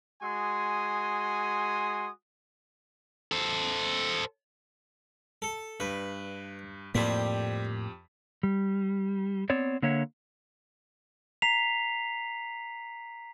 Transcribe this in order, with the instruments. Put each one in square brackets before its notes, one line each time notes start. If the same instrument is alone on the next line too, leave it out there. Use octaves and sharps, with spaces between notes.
[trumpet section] G#3 F#4 G#5 C6 D#6
[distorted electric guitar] A4 C5
[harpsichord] A4
[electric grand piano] G2 [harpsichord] B4
[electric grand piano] F2 G4 B6 [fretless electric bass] A2 A#3 [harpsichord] G3 C5
[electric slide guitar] G3
B3 C4 C#5 D5
D3 A#3 C#5 E5 F#5
[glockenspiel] A#5 B6 C7 F7